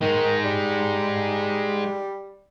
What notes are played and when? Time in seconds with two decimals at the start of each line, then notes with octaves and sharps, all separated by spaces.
0.01 D#3 G#3 D#4
0.45 G3